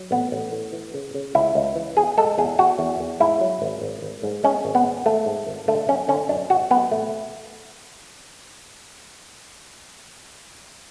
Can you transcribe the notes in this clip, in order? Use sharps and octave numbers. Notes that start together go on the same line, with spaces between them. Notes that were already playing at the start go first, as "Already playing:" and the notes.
Already playing: F#3
A1 B3
A1
A2
E3
C#3
C#3
C#2 E4
C#2
E3
E2 G#4
G#3 A4
E2 G#4
E2 F#4
E2
E2
G#2 E4
F#3
G#1
G#1
G#1
G#2
G#3 C#4
G#1
B3
G#1
G#1 A3
G#2
G#1
D3 A3
F#2 C#4
D3 C#4
F#2 D4
G#1 F#4
F#2 B3
A1 A3